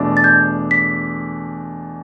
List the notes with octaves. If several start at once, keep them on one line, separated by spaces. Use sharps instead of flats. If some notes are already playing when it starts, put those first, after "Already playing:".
Already playing: E2 B2 A3 D4
A6
G6
B6